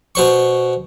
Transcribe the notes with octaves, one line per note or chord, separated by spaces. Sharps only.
B2 C5 C#6